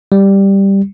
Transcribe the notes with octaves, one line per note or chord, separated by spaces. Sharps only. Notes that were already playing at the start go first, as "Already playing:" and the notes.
G3